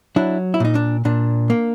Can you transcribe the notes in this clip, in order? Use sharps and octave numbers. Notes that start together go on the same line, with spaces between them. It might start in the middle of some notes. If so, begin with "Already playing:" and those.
F#3 D4 E4
E4
A#2 D#4
D4
A#2 D4
A#3